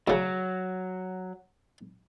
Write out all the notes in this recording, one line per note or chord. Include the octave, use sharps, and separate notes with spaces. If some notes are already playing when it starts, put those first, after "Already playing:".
D2 C#3 F#3